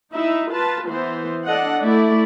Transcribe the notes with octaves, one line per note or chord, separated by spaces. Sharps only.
D#4 E4 E5
F4 B4 A5
E3 B3 C5
D4 A4 D#5 F#5
A3 E4 D5